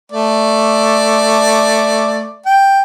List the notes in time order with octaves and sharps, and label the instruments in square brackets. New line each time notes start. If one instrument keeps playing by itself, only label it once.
[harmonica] A3 D5
G5